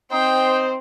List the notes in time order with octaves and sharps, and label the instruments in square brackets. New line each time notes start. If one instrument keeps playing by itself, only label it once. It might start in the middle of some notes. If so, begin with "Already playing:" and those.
[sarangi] C4 [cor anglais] D#4 [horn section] C5 [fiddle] G5